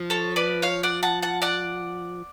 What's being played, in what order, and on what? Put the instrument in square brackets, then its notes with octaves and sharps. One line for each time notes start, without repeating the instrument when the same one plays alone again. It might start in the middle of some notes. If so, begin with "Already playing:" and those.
Already playing: [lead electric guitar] F3
[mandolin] A4 C#5
B4 D5
C#5 F5
D5 F#5
F#5 A5
F#5 A5
D5 F#5